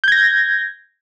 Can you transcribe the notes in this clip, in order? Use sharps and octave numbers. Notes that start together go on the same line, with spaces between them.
G6 G#6 A#6